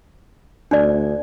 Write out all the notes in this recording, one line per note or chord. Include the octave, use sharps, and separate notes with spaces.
D2 D4 D5